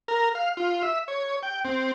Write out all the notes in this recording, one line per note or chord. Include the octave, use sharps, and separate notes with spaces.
A#4
F5
F4
E5
C#5
G5
C4